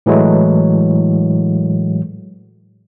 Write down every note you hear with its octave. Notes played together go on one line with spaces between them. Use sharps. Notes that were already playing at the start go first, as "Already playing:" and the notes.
A2 E3 F#3 G#3 A3